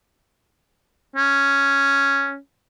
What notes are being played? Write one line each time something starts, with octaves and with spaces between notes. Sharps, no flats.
C#4